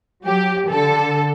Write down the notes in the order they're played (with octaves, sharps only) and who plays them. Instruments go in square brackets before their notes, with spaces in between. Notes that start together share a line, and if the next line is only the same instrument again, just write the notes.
[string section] F#3 G4
D3 A4